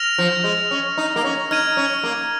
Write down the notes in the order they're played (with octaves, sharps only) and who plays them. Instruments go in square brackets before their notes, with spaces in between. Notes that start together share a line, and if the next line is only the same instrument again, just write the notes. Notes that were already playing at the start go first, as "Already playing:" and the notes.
Already playing: [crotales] F6 A#6 F7
[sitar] F3
G#3
C#4
D#4
A#3
C#4
[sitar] D#4 [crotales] F6 G#6 D#7
[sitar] C#4
A#3